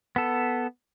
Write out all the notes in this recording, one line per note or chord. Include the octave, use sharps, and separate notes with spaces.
B3 A4